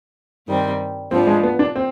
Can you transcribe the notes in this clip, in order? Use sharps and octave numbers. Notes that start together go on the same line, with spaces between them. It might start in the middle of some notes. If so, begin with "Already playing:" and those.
G2 D#3 G3 C4
G#2 F3 B3 C4 D4
G#3
B3
D4
C4